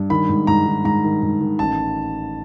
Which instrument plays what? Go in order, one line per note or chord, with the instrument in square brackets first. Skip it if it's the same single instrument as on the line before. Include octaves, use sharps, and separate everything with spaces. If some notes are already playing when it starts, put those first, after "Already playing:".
Already playing: [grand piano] G2
D#3 B5
G#2
G#2 A#5
D#3
G#2 A#5
D#3
G#2
D#3
A1 A5